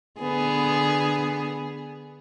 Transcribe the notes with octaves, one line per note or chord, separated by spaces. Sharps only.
D3 B3 G#4